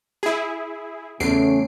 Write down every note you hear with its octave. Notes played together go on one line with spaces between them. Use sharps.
E4 G#4
E2 C#3 A3 C#4 C7 D7